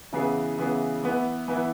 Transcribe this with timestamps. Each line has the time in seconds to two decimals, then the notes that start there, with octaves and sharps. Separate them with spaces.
0.13 C#3 E3 B3 E4 G#4
0.58 C#3 E3 B3 E4 G#4
1.03 E3 B3 E4
1.48 E3 B3 E4